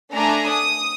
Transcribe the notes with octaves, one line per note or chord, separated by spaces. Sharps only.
A3 D4 G#5 A#5
D#6